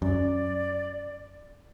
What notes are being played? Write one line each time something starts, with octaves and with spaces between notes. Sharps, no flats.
F#2 D5